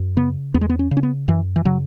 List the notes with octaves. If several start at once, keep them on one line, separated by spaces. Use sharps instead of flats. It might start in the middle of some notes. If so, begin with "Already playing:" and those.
Already playing: F#2
C#3 B3
E2 B3
G#3
B3
C#4
C#3
C#4
B3
F#2 E3
E3
C#3 F#3